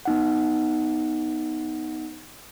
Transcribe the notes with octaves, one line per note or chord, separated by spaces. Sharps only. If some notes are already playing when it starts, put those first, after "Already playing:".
B3 D#4 F#5